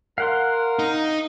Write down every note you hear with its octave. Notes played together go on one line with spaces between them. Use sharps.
A#4 F5 F#5 C6
D#4